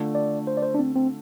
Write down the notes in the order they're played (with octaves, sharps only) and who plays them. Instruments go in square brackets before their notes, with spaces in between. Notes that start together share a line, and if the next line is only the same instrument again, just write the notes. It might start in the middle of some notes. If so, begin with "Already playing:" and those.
Already playing: [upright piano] D3 A3 F4
[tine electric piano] D5
C5
D5
C5
D4
C4
C4